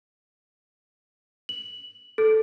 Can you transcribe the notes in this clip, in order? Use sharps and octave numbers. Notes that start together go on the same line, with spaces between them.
F#7
A4